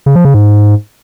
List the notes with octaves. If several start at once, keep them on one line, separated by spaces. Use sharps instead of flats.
C#3
F3
C#3
G#2